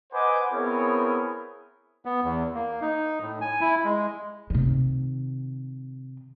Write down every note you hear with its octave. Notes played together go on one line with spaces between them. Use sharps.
B4 C5 D#5 F#5 G#5 D6
B3 C4 E4 G#4 A#4 C#5
B3
E2
A#3
D#4
A2
G#5
E4
G#3
C3 D#3